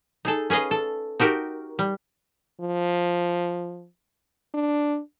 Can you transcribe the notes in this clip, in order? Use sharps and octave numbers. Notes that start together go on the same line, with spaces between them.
D#4 G#4 A4
C#4 G#4 B4 D#5 F5
A4
D#4 F#4 G4 A#4
G3
F3
D4